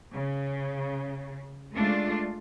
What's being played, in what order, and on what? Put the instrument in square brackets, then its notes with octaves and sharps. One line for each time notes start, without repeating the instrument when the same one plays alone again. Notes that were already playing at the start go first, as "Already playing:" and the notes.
[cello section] C#3
G#3 A3 D4 F4